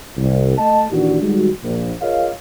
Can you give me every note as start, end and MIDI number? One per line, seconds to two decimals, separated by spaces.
0.18 0.57 36
0.58 0.86 57
0.58 0.86 75
0.58 0.86 81
0.91 1.20 46
0.91 1.20 51
0.91 1.20 52
0.91 1.20 62
0.91 1.20 66
0.91 1.20 67
1.22 1.49 51
1.22 1.49 55
1.22 1.49 56
1.22 1.49 66
1.64 1.93 34
2.01 2.30 65
2.01 2.30 68
2.01 2.30 70
2.01 2.30 73
2.01 2.30 75
2.01 2.30 77